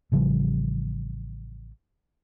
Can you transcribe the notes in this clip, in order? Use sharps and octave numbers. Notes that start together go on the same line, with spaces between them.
A1 C#3 F3 G3